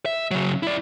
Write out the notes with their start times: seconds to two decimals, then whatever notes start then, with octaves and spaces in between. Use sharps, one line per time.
0.06 E5
0.31 C#3 F#3
0.63 E4 D5